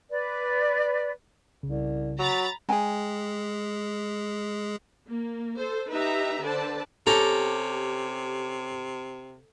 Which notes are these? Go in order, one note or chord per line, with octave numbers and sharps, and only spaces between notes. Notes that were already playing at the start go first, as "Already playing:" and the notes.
B4 D5
C2 C#3
F#3 A#5 B5 A6
G#3 G#4 G5 G#5 A#5
A#3
A4 C5
D#4 G4 B4 E5 A#5
D3 B4 C5 D5 A5
C3 C#4 G4 A4 A#5